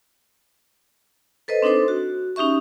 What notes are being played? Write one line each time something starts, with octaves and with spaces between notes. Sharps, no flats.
A4 B4 C5 D#5
C4 D4 D#4 A4 C5
F#4
C#4 D#4 G4 E5 C#6